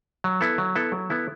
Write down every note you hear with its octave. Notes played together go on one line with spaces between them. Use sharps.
F#3
B3 E4 A4
F#3
B3 E4 A4
F#3
B3 E4 A4